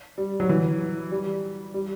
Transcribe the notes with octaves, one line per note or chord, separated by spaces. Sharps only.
G3
F#3
E3
G3
G3